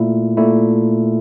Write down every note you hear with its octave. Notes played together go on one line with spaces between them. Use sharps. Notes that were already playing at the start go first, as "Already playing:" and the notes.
Already playing: A#2 A3 E4
A#2 A3 E4